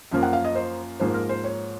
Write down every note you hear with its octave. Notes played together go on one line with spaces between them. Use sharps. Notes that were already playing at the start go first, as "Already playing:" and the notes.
F#2 F3 A#3
F#5
F5
D#5
C5
G#2 F3 A#3 C5
A#4
C5
C#5